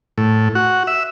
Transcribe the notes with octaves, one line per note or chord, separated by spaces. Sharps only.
A2
F#4
E5